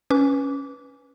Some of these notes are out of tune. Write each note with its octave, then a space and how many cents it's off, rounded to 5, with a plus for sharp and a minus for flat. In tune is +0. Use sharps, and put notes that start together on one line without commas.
C#4 +0 B4 -10 D6 -25